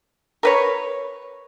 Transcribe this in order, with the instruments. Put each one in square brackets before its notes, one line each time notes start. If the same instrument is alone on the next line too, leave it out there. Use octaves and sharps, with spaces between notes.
[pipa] A#4 B4 C#5